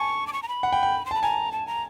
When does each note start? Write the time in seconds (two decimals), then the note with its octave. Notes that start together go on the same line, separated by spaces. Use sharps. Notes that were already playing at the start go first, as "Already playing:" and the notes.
Already playing: G#5 A5 C#6
0.27 D6
0.33 C#6
0.43 A#5
0.48 B5
0.63 F#5
0.73 G5
0.83 G5
1.06 C6
1.11 A5 B5
1.22 G#5 A#5
1.52 A5
1.67 A#5